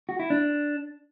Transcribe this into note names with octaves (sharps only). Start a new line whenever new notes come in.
F#4
E4
D4